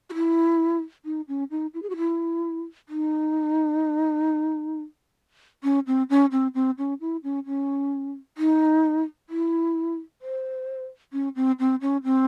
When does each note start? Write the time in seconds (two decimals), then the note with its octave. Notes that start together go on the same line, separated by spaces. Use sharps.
0.10 F#4
0.13 E4
1.05 D#4
1.28 C#4
1.51 D#4
1.74 E4
1.82 G#4
1.90 F#4
1.97 E4
2.89 D#4
5.63 C#4
5.87 C4
6.10 C#4
6.32 C4
6.55 C4
6.78 C#4
7.01 E4
7.24 C#4
7.46 C#4
8.38 D#4
9.29 E4
10.22 C5
11.13 C#4
11.36 C4
11.59 C4
11.81 C#4
12.04 C4